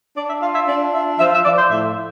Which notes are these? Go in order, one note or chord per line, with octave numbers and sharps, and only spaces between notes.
D4 D5
E5
F4 F5
E5
D4 D5
F4 E5
F3 E5
E5
F3 D5
C5
A2 E5